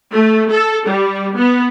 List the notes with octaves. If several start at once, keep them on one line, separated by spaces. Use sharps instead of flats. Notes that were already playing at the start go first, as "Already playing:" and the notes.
A3
A4
G3
B3